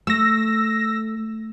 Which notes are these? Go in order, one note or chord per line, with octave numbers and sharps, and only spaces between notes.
A3 E6 A#6